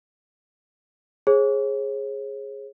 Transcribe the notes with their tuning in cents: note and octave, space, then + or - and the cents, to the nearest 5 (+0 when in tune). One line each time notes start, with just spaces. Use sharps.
G#4 +0 C#5 -40